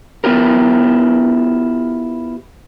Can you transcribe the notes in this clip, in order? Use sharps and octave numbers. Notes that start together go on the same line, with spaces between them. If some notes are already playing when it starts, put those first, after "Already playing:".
B3 E4 F4 G4 A#4